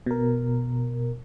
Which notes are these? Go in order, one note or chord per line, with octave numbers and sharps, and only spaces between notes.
B2 A#4